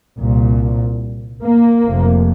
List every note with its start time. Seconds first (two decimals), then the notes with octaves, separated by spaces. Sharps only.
0.17 C2 A#2
1.43 A#3
1.85 F1 F2 C3